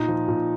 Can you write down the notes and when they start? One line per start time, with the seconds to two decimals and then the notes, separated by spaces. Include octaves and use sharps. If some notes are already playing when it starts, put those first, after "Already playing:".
Already playing: A#2 D#4
0.08 F3
0.28 A#2